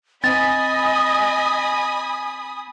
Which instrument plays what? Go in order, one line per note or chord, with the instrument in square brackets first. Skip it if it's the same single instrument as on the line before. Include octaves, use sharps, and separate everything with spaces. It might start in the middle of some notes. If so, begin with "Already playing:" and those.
[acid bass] C4 [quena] D#5 [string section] G#5 B5 D#6 [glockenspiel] A6